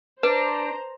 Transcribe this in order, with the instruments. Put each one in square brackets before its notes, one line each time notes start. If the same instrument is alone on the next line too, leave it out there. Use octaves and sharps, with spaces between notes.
[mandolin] D4 [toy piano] B4 [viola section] C5 A#5